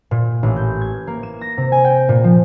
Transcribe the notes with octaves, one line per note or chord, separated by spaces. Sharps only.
A#2
A1
G6
G#6
A#3
E7
A#6
C3
G#5
G5
A#2
F3